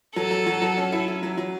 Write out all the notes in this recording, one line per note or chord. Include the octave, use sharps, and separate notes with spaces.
F#3 A4
F#3
F#3
F#3
C#4
E4
E4
F#3
F#3